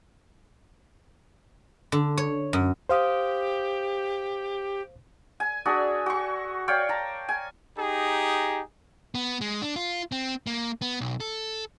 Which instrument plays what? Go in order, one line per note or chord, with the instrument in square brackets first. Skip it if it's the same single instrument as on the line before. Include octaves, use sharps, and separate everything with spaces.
[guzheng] D3
C#5
F#2
[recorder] G4 [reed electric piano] C5 F5 D#6
[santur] G#5
D4 F#4 G#4 E5
F#4 C#6
C#5 D5 F5 G5
A5 A#5
G#5
[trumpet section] D#4 G4 G#4 A#5
[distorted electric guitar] B3
G#3
D4
F4
C4
A#3
B3
B1
A4